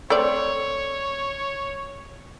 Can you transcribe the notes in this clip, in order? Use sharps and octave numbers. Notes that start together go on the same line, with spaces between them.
A3 C4 C#5 D5